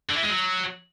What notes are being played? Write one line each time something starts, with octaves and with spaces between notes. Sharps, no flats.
D3
E3
G#3
F#3